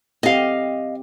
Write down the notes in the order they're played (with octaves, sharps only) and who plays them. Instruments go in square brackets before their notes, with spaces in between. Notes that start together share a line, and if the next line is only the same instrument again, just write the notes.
[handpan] C4 G4 [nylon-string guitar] D#5 F5